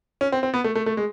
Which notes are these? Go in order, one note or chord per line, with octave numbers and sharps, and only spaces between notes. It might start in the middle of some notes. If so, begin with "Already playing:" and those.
C#4
C4
C4
B3
A3
A3
A3
G#3